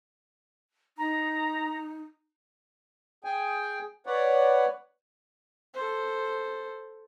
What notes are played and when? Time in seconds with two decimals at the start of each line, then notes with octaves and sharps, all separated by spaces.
0.98 D#4 A#5
3.24 G#4 G5 G#5
4.06 B4 C#5 D5 F#5
5.74 A4 C5